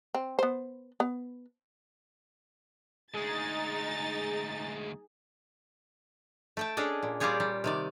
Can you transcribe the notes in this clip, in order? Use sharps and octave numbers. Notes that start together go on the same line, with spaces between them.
C4
B3 C5
B3
D2 G#3 D#4 G#4 A6
A3 G5 A5
C#4 D4 G#4 A4 D#5
A#2
G3 A#3 F4 G4 G#4 C#5
G3
C3 D#3 D5